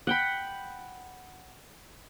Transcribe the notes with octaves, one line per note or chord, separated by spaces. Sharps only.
F#5 G5 B5